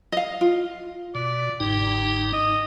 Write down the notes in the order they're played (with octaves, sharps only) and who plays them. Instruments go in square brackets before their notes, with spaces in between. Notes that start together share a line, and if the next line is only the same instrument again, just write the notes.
[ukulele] D#5 F5
F4
[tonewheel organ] B2 [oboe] D5
[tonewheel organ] G1 G#2 D#4 [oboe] G4
[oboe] D#5